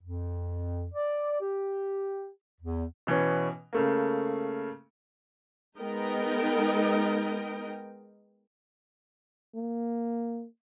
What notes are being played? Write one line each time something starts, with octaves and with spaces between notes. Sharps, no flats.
F2
D5
G4
E2
B2 E3 B3 C#4
C#3 A3 A#3
G#3 B3 D#4 A#4 D#5 G5
A#3